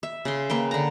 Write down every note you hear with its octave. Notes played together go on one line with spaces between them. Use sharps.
E5
C#3 C6
A#3 B4 G5
D3 A#5